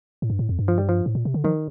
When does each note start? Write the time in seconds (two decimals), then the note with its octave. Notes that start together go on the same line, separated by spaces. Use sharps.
0.22 A2
0.30 G2
0.39 A2
0.49 F2
0.59 G2
0.68 F3
0.78 G3
0.89 F3
1.06 A2
1.15 A#2
1.25 C3
1.34 D3
1.44 D#3 F3